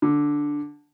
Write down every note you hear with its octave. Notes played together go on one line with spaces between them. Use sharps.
D3